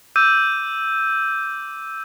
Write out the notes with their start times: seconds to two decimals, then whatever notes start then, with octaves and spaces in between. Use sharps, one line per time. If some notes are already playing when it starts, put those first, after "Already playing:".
0.16 D6 E6 G6 D#7